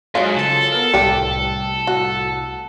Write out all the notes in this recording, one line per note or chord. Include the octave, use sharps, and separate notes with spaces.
G#2 F#3 F4 G#4
C#3 A4 A5
B3 A#4
C2 A2 G4 B4 G5
F#4